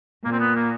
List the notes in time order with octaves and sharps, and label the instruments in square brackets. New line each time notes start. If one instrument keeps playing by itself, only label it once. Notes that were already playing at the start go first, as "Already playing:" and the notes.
[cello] A#2 [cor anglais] A#3
[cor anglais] C4
B3
A#3